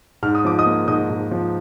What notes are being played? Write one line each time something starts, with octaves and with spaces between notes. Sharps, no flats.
G#2 F6
D#6
F3 D6
D#5 D#6
A#3
G#2 D#5 D#6
G#2
F3